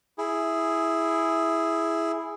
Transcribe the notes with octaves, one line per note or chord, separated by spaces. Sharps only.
E4 G#4